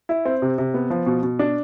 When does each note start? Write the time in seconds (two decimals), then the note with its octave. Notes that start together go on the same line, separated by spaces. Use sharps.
0.09 E4
0.25 C4
0.42 C3
0.58 C3
0.74 B3
0.90 F3
1.06 B2
1.23 B2
1.39 D4